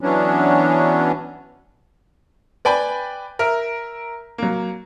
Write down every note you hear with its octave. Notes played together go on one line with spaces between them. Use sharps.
E3 F#3 B3 C#4 D4
B4 D5 G5 G#5 B5
A#4 E5 F6
F#3 A#3